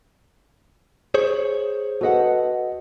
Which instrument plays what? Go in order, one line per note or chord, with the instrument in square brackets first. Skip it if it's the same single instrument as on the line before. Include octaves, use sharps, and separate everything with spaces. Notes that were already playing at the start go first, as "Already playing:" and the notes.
[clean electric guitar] G#4 C5 C#5
[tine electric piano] F#4 D#5 [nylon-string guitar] A4 B4 F#5